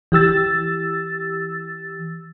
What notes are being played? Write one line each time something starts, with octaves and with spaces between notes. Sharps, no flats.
E3 G4 E6 A6